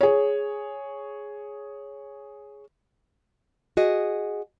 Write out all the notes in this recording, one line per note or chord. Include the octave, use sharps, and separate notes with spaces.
G#4 C#5
F#4 G#4 D#5